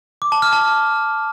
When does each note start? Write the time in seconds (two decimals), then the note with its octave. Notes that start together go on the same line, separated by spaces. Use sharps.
0.22 D6
0.32 A5
0.42 F6
0.53 A5